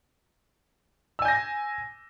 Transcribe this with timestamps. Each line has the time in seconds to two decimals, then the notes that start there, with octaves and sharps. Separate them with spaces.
1.19 E6
1.22 G#5
1.25 G6
1.28 A#6